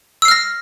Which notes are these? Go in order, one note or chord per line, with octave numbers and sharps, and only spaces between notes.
E6 F6 A#6 C7